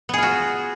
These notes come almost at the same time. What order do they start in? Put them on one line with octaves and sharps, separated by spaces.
B3 G#4 F4 F#4